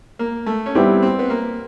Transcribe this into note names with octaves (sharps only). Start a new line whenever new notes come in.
A#3
A3
C#4
G3 B3 C4 E4 G4
C4
B3
A#3